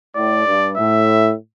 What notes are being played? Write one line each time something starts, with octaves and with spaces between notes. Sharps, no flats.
A2 D5
G2
A2 E5